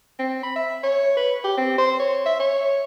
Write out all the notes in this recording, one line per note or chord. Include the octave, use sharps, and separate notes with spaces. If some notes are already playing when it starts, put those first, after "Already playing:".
C4
B5
E5
C#5
B4
G4
C4
C5
C#5
E5
C#5